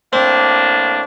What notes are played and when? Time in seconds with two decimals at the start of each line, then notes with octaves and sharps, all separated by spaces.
0.13 A2 A#3 C4 D4